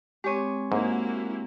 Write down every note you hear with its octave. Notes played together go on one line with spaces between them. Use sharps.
G#3 C4 G4 C#5
G#2 A#3 E4 F#4